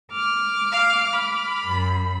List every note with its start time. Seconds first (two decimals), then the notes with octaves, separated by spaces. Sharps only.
0.12 D6 F6
0.72 F5
1.13 B5
1.64 F#2